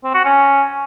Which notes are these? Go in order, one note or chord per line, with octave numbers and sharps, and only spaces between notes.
C4
F#4
C#4